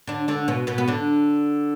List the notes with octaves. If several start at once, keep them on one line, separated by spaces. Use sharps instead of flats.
D3 D4
D3 D4
B2 B3
B2 B3
B3
D3 D4